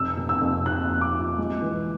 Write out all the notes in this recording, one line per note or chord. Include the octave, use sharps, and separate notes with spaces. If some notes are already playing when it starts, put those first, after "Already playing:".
Already playing: F1 E6
F1
E6
F2
C3 F#6
F2
D6
F3
G#3
E3